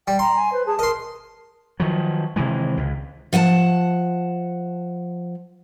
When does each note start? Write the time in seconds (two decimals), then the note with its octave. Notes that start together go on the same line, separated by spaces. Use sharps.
0.07 G3 G5
0.19 A#5 C6
0.35 G#5
0.52 B4 C5
0.67 G#4 A5
0.79 A#4 D#5 C6
1.80 D#3 F3 F#3
2.36 C3 D#3 E3 G#3
2.77 C#2
3.33 F3 F#5 G#5 A5